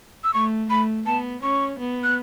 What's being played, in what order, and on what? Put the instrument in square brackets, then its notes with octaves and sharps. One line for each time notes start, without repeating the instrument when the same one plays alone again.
[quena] E6
[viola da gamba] A3 [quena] C#6
[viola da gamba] A3 [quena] B5
[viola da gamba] B3 [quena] A5
[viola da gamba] C#4 [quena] C#6
[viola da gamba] B3
[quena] F#6